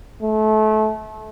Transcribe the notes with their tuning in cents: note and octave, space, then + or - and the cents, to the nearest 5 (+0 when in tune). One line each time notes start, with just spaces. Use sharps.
A3 -25